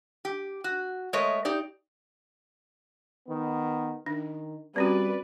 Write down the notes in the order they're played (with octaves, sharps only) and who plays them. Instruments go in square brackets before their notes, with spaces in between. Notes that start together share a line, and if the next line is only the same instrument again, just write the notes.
[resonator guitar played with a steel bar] G4
F#4
G#3 A3 A#4 C#5 D#5
D#4 G4 D5
[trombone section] D#3 B3
[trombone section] D#3 [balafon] D4
[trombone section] G3 [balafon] C4 C#4 F#4 [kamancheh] B4 D5